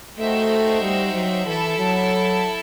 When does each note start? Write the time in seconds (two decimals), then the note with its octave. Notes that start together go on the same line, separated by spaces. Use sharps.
0.18 A3 D#4 F#4 C5 E5 G5
0.82 G3
1.13 F#3
1.46 E3 E4 A4 E5 A5
1.78 F#3